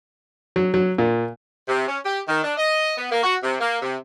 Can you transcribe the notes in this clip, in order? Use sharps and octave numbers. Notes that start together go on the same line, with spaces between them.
F#3
F#3
A#2
C3
C#4
G4
D#3
D4
D#5
B3
A#3
F#4
C3
A#3
C3